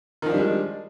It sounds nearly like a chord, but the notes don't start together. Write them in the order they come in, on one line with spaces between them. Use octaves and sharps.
D#3 F3 D4 G3 G#3